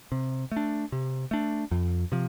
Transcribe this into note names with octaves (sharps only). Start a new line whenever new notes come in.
C3
A3
D4
C3
A3 D4
F2
C3 F3